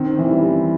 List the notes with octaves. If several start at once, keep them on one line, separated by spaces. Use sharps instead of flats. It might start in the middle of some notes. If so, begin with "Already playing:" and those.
Already playing: D#3 C4
E3
G3